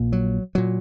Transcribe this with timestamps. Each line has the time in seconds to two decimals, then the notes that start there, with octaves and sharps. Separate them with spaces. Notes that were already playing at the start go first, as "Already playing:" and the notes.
Already playing: A#1 A#2
0.12 F#3
0.55 A#2 F#3